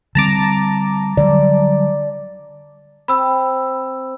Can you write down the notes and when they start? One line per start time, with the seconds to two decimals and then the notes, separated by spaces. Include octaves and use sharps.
0.15 D3 G3 C4 A5 A#5 D6
1.17 D3 F#3 G3 D5
3.08 C4 B5 E6